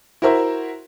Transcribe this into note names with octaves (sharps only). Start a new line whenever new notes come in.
E4 F#4 A#4 C5 E5